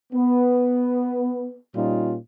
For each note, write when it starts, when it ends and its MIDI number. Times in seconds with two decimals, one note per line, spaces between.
0.13 1.59 59
1.76 2.16 46
1.76 2.16 55
1.76 2.16 61
1.76 2.16 63
1.76 2.16 65